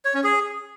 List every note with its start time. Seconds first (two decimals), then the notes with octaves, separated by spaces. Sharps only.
0.05 C#5
0.14 C#4
0.24 G#4